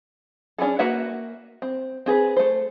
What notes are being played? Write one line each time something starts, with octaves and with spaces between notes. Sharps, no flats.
C#4 D4 E4 G#4 A4
A#3 F#4 B4 E5 F#5
C4
C4 G#4 A#4 B4
A3 C5